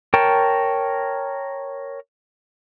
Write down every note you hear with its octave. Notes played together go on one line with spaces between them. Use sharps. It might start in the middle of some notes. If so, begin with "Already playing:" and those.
A#4 C#5 G5 A5